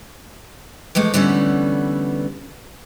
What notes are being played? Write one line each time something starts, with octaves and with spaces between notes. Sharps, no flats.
E3 F3 G#3 A3
D3 E3 G3 A3 B3 C#4